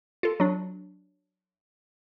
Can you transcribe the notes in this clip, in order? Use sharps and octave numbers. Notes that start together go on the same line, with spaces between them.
F4 A4
F#3 D4